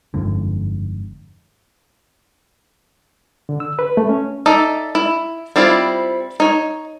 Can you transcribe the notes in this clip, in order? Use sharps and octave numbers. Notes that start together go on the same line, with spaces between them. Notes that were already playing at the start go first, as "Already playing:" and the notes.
G1 F2 G#2 D3
D3
E6
B4
A3
C#4
D#4 A4 D5 E5
E4
G3 C4 E4 F4 D5
D#4 C#5